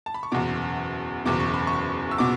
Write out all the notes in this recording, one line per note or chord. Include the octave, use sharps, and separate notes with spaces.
A5
B5
C#6
F#1 E2 B2 D6
F#1 E2 B2 D6
C#6
B5
C#6
E6
B2 D6